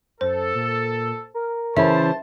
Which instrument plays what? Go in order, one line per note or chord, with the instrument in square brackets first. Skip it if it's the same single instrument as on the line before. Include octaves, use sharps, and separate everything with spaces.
[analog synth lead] F#2 [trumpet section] A4 [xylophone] C5
[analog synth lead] A#2
A#4
[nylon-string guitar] C#3 E3 C#4 [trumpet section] C5 A5 [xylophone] E5